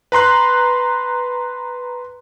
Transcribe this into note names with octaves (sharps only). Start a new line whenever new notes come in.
B4 A#5 C6 F#6